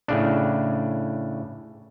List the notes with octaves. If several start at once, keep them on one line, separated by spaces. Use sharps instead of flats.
A2 C#3 D4